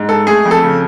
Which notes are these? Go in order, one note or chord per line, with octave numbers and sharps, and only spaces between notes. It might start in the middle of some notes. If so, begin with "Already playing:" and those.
Already playing: G#2
G#3 A4
A3 G#4
F2
A4
C#3